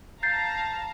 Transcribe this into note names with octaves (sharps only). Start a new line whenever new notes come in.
F5 A5 A#5 G6 A6 C7